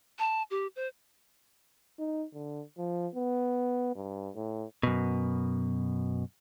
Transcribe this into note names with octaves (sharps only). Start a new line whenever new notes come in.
A5
G4
C5
D#4
D3
F3
B3
G2
A2
F#2 B2